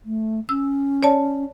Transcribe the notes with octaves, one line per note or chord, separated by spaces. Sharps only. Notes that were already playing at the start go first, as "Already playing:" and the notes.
A3
C#4 E6
C#5 D5 A5